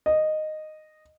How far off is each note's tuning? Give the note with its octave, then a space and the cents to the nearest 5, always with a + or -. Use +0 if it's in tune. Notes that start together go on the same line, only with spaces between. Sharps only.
D#5 -10